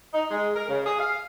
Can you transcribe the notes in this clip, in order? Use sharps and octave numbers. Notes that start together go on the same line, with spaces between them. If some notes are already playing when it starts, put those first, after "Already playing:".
D#4
G#3
A#4
C#3
G#4
F5